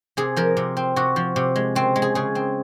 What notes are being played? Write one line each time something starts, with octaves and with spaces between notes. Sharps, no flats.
C3 G#4
F3 A#4
C3
C4
C3 F#4
F3
C3
G#3
C#3 C4
G#3
G#4
C#3 G#4
C4